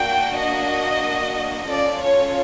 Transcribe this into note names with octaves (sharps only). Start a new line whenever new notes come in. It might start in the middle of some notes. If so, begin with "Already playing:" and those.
Already playing: A#3 D4 F#4 G5
D#5
C#4 F4 A4 D5
C#5